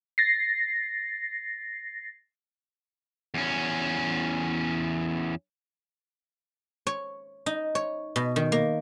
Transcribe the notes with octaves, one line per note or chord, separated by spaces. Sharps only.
A6 A#6 C7
E2 C#4
C#5
D#4
C#5
B2
D#3
A#3